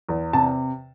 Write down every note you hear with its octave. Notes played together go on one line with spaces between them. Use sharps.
E2
C3 A5